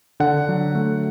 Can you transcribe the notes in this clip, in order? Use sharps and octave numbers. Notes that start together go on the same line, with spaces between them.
D3 F#5
F#3
A3